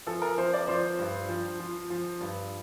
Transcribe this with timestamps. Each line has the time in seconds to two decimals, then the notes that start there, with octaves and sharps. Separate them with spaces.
0.07 F3 A4
0.22 A#4
0.38 F3 C5
0.53 D5
0.68 F3 C5
0.99 G2
1.29 F3
1.60 F3
1.90 F3
2.21 G2